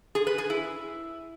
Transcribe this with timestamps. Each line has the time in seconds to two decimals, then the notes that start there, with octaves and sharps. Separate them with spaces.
0.15 G#4
0.27 B4
0.38 G#4
0.50 E4